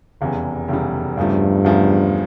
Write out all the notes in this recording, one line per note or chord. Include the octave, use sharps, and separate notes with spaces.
F1 E2 C#3 E3 G3
F1 E2 C#3 E3 G3
E2 G2 C#3 F3 A3
E2 C#3 F3 A3